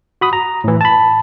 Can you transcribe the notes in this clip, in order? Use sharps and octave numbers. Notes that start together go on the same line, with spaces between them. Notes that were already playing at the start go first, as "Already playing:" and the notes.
F#4 B5 D#6
A#5
A2 E3
A5 B5